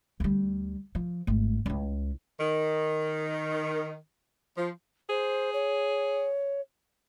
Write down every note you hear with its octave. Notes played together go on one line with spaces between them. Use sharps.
D2 G3
F3
G#1 A3
C#2 E4
D#3
F3
G#4 C5
C#5